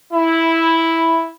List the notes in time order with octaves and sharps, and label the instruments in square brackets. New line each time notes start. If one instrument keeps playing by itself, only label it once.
[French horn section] E4